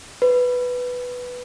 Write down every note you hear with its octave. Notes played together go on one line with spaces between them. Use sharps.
B4